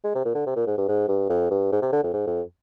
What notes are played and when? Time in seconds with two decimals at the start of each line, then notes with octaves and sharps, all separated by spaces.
0.04 G#3
0.15 C3
0.25 A#2
0.35 D3
0.46 C3
0.56 A#2
0.67 G#2
0.78 G2
0.88 G#2
1.08 G2
1.30 F2
1.51 G2
1.72 G#2
1.82 C3
1.93 D3
2.03 F2
2.14 G#2
2.27 F2